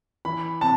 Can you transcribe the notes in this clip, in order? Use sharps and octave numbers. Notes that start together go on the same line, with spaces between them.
E3 B5
C3 A5